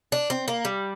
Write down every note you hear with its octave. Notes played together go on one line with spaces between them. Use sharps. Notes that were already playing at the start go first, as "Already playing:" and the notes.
D4
C4
A#3
G3